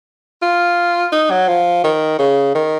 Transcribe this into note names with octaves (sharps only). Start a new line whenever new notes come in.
F4
D#4
F#3
F3
D#3
C#3
D#3